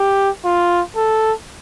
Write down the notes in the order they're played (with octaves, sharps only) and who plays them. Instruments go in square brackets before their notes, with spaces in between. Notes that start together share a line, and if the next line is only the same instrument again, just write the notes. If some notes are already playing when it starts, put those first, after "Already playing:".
Already playing: [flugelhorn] G4
F4
A4